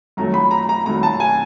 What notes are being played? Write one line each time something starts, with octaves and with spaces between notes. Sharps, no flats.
F#2 D#3 F#3 A3 A#5
B5
A#5
A#5
F#2 D#3 F#3 A3 A#5
A5
G#5